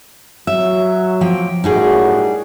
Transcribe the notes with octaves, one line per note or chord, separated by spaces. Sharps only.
F#3 E5
F3 A#3 G5
F#2 A2 G3 D#4 F#4 G#4